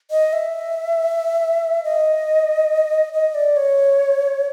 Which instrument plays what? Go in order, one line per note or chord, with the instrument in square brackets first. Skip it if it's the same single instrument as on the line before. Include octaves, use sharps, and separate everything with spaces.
[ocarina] D#5
E5
D#5
D#5
D5
C#5